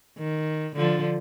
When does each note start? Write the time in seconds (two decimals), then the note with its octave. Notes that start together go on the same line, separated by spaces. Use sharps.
0.18 D#3
0.76 D3 F3